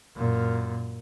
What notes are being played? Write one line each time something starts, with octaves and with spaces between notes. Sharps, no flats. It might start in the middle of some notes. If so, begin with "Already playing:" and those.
F#2 A#2